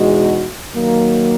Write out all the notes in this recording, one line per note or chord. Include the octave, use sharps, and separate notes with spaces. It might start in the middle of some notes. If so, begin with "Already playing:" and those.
Already playing: E2 B2 G#3 D#4 F#4
D#3 F#3 A#3